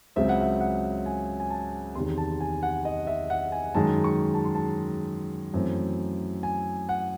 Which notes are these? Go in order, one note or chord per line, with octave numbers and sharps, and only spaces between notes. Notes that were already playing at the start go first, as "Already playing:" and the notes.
C#2 C#3 F#3 C4 E5
F#5
E5
F#5
G#5
G#5
A5
E2 C3 D#3 C6
A5
G#5
F#5
D#5
E5
F#5
G#5
F#2 D#3 G#3 A5
C#6
A5
C6
A5
F#2 E3 A3 C4
G#5
F#5